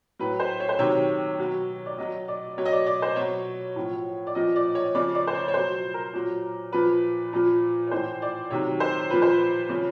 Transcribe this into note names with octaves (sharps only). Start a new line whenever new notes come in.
A2 F#3 B4
C5
C#5
C5
C3 D#3 F#3 C#5
B2 F#3
D5
B2 F#3 D#5
D5
B2 F#3 C#5
D#5
D5
D5
C5
B2 F#3 C#5
A2 F3
D5
A#2 F3 D#5
D5
C#5
C#3 F3 D5
D5
C5
C#5
C#5
B2 F#3 C5
A#4
A#2 F#3
A#2 F3 B4
A#2 F3
C#5
A2 E3 C5
D5
C3 D#3 F#3 C#5
C5
A#2 F3 B4
C5
B4
C#3 F3